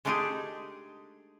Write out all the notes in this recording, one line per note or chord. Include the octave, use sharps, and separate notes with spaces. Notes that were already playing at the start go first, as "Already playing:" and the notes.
G#3 A3 D4 D#4 G4 G#4